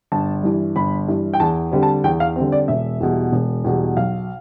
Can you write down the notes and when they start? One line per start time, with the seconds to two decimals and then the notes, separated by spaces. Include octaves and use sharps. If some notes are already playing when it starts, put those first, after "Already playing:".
0.12 G1 A5
0.43 G2 E3
0.76 G1 B5
1.08 G2 E3
1.34 G5
1.40 E2 A5
1.72 D3 G3 C4
1.83 A5
2.04 E2 G5
2.20 F5
2.36 D3 G3 C4
2.52 D5
2.68 E1 E5
3.00 E2 B2 G3
3.32 E1
3.64 E2 B2 G3
3.97 B1 F5